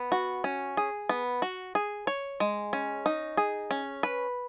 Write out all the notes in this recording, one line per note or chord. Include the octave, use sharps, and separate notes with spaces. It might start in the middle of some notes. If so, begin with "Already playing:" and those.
Already playing: B3
F#4
C#4
G#4
B3
F#4
G#4
C#5
G#3
C#4
D#4
G#4
C#4
B4